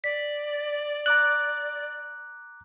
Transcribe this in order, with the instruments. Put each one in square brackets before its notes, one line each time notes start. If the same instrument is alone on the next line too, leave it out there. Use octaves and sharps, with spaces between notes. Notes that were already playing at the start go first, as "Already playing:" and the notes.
[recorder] D5 [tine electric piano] B6
[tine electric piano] A#5 D6 F#6